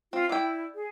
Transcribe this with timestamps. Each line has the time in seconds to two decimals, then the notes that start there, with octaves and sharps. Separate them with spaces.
0.13 C4 F4
0.29 E4 D5 G5
0.75 G#4